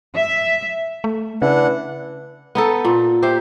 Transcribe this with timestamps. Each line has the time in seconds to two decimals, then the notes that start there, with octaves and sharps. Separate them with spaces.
0.15 E5
1.04 A3
1.42 C#3 E3 D4 F#5
2.55 B3 D#4 A4
2.85 A#2
3.22 G4 C5 E5